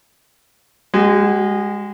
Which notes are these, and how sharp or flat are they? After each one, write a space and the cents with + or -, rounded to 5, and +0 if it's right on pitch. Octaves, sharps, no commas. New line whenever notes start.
G#3 -20 F#4 +35